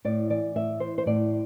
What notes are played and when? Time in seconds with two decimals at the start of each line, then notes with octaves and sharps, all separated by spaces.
0.05 A2 D5
0.30 E3 D5
0.55 A2 E5
0.80 E3 C5
0.98 C5
1.06 A2 D5